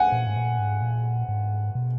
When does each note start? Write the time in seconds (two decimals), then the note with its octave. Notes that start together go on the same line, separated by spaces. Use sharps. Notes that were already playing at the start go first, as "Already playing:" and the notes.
Already playing: F#5 G#5
0.12 A#2
0.27 G#2
0.36 A#2
0.59 G#2
0.82 A#2
1.29 G#2
1.75 B2